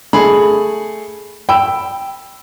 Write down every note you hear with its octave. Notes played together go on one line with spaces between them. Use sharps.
A3 G#4 B5
G5 B5 E6